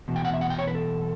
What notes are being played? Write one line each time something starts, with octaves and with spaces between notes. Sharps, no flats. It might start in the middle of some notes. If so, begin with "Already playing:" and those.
E2 B2
G5
F#5
E5
F#5
G5
C#5
B4
A4